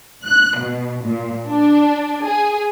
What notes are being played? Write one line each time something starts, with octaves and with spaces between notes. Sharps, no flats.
F#6
B2
A#2
D4
G#4